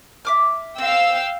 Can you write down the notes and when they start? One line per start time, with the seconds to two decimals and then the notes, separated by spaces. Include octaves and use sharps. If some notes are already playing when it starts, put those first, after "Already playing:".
0.25 E5 D6 F6
0.78 C4 F5 G5 E6